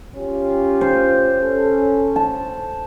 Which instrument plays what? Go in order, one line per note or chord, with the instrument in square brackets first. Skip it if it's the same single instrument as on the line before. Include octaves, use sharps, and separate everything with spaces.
[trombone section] C#4 F4 G4
[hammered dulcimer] C5
[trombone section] C#4 A4
[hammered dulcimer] A5